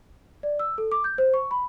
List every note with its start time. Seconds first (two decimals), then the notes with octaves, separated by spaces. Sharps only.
0.43 D5
0.59 E6
0.78 A4
0.92 D6
1.04 G6
1.18 C5
1.34 C#6
1.51 B5